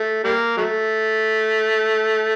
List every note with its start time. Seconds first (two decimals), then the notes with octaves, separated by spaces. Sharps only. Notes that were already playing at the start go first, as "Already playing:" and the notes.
Already playing: A3
0.24 G3 A#3
0.57 F#3 A3